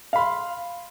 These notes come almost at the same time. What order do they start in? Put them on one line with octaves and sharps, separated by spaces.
F5 B5 C6